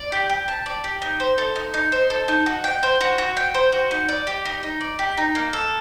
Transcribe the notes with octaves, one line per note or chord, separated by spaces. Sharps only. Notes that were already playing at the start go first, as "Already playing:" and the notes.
Already playing: D5
G4
G4
A5
D5
G4
D#4
C5
A4
D#4
D#4
C5
A4
D#4
F#4
G5
C5
F#4
F#4
G5
C5
F#4
D#4
D5
G4
D#4
D#4
D5
G4
D#4
A#3
A4